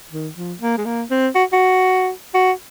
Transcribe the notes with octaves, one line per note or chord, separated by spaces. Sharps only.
D#3
F3
A#3
G#3
A#3
C4
F#4
F#4
F#4